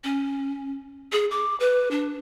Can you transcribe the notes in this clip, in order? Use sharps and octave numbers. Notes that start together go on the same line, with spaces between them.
C#4
G#4
D6
B4
D4